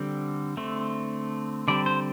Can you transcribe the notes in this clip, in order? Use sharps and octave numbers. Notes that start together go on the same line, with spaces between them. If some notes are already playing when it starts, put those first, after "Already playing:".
Already playing: D3 G3 C4
D3 A3 C4
D3 G3 C4 D5
C5